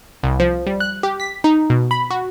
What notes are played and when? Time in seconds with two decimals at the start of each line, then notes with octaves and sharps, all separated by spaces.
0.23 C2
0.40 F3
0.67 G3
0.80 F#6
1.03 G4
1.20 B6
1.44 D#4
1.70 B2
1.91 B5
2.10 F#4